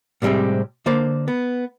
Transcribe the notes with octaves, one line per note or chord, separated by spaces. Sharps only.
A2 C3 G3 G#3 C4
D3 A#3 C5 D5
B3